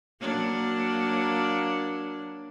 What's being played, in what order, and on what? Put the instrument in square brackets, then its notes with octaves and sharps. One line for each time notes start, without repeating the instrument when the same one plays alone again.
[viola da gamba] F#3 A#3 D4